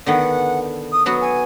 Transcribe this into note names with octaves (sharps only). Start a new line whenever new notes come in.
D3 D#3 B3 F#5
D#6
F#3 B3 F#4 D#6
G#5